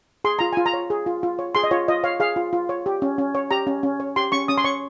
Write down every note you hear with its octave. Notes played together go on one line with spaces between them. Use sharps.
G#4 C6
F4 A#5
F4 G#5
A#5
C#5
G#4
F4
F4
C#5
G#4 C6
D#5
F4 C#5
F4 D#5
C#5 F5
G#4 F5
F4
F4
C#5
G4
C#4
C#4
C#5
G4 A#5
C#4
C#4
C#5
G4 C6
C#4 C#6
C#4 D#6
C6
C#5 C#6